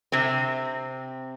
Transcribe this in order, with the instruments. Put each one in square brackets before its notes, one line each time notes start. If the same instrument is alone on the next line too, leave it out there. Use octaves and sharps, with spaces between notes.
[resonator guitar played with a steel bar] C3 C4